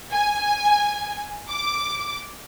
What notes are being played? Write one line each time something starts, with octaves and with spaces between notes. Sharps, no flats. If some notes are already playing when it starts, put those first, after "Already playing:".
G#5
D6